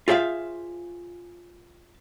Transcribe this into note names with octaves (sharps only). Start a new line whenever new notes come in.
F4 G#4 C5 E5 F5